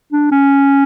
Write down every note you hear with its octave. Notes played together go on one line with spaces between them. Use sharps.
D4
C#4